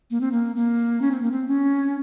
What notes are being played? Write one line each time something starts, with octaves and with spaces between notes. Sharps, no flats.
A#3
C4
A#3
A#3
C#4
C4
A#3
C4
C#4